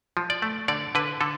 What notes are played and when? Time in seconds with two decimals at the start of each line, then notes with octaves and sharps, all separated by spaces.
0.17 F3
0.30 D5
0.42 A3
0.68 D3 D5
0.95 D3 B4
1.21 D3 A4